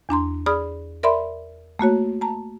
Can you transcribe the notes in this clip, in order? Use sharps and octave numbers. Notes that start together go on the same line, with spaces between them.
E2 D4 A#5 C6
G#4 D5 B5 D#6 F6
A#4 D5 E5 B5 C6
A3 A#3 F#4 C#5
A5 A#5